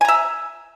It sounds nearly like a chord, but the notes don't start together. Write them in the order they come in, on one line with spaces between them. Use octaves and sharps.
G#5 A#5 E5